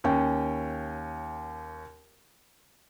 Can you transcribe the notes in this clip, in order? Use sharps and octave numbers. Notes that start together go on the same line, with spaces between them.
D#2 C#4 G5